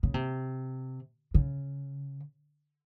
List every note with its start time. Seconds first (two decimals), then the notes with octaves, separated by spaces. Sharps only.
0.03 C#3
0.14 C3
1.34 C#3